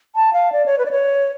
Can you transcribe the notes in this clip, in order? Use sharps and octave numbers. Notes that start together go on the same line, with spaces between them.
A5
F5
D5
C#5
B4
D5
C#5